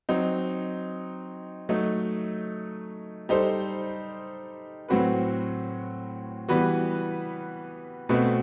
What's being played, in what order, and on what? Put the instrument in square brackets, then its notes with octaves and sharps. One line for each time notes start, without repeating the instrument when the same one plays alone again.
[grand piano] F#3 C4 D#4
F#3 A3 D#4
G3 D#4 A4 C5
A2 F#3 C4 F#4 B4
E3 G3 B3 F#4 B4
B2 A3 C4 F#4 B4